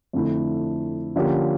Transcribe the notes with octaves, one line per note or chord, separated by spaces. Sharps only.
F2 D3 A3 E4
D3 F3 A#3 C#4 G4